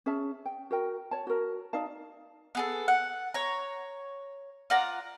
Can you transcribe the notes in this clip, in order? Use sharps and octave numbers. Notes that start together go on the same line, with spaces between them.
C#4 G#4 E5 A5
G5
F#4 A#4 G5
C#5 A5
F#4 A#4
D#4 D5 F5 A5
B3 G#4 A4
F#5
C#5 A#5
F4 D5 F#5 A#5